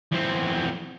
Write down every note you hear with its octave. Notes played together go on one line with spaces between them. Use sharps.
E2 C4